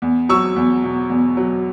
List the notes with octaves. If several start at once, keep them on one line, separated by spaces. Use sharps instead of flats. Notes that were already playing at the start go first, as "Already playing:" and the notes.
E2
F#3 C#6 E6
E2
B2
E2
F#3